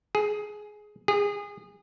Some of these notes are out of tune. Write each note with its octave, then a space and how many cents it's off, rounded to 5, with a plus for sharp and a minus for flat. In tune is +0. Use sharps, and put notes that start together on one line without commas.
G#4 +15
G#4 -25